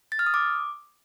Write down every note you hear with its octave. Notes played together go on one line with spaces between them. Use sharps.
A6
F6
D#6
D6